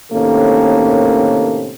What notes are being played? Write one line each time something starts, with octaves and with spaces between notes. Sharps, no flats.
A2 C3 D#3 A#3 C#4 A4